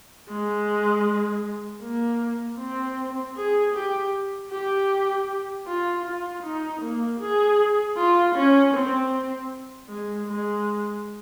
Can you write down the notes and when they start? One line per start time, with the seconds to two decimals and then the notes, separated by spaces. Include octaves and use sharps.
0.29 G#3
1.82 A#3
2.59 C4
3.36 G#4
3.75 G4
4.51 G4
5.67 F4
6.05 F4
6.43 D#4
6.82 A#3
7.20 G#4
7.97 F4
8.36 C#4
8.74 C4
9.89 G#3
10.27 G#3